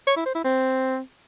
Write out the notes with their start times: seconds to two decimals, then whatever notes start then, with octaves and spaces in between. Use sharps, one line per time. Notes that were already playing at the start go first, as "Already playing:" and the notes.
0.07 C#5
0.16 E4
0.26 C5
0.35 E4
0.44 C4